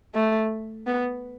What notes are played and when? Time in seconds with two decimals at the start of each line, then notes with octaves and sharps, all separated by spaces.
0.15 A3
0.87 B3